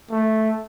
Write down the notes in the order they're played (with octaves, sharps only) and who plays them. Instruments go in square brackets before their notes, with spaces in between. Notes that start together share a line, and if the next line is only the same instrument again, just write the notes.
[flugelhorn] A3